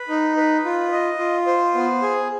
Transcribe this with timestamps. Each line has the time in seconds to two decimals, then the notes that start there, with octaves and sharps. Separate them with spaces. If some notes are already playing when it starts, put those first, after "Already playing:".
Already playing: B4
0.09 D#4
0.37 B4
0.65 F4
0.92 D#5
1.19 F4
1.46 C5
1.74 B3
2.02 G#4